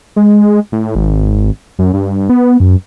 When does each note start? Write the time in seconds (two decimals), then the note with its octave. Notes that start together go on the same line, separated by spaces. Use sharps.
0.16 G#3
0.72 A2
0.95 G#1
1.79 F#2
1.93 G2
2.29 B3
2.60 F#2